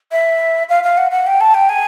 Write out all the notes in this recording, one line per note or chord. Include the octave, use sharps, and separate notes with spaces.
E5
F5
F5
F#5
F#5
G5
A5
G5
G#5